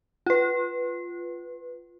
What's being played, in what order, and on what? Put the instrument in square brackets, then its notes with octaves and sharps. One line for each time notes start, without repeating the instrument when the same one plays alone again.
[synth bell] F4 B4